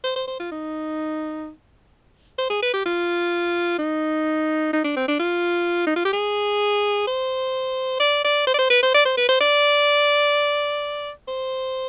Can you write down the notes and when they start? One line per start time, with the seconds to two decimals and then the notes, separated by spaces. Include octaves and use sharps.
0.04 C5
0.16 C5
0.28 C5
0.40 F4
0.52 D#4
2.39 C5
2.50 G#4
2.63 B4
2.74 G4
2.86 F4
3.79 D#4
4.73 D#4
4.84 D4
4.97 C4
5.08 D4
5.20 F4
5.87 D#4
5.96 F4
6.05 G4
6.13 G#4
7.07 C5
8.00 D5
8.25 D5
8.47 C5
8.54 D5
8.59 C5
8.70 B4
8.83 C5
8.94 D5
9.05 C5
9.17 B4
9.29 C5
9.41 D5
11.28 C5